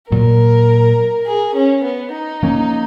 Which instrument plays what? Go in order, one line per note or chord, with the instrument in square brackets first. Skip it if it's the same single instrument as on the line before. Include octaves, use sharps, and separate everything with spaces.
[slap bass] A#2 F#3 A#3 [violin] A#4
[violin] G#4
C#4
B3
D#4
[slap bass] F3 A#3 C#4